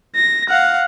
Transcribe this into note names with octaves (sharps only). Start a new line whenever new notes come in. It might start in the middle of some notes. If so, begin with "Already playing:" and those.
A#6
F5 F#5